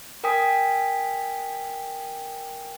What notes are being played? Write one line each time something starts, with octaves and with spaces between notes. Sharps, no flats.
A#4 G5 G#5 D#6 B6